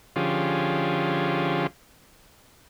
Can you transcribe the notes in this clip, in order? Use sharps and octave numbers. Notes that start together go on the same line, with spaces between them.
D3 F3 C#4 F4 G4 G#4